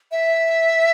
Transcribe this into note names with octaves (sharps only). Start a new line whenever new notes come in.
E5